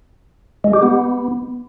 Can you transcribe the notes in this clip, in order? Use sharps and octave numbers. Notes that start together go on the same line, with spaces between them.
G#3
G4
B3